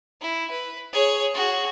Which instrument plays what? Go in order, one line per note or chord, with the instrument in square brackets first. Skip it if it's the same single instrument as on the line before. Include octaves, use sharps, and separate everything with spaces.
[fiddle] E4
B4
G#4 C#5
F#4 G#4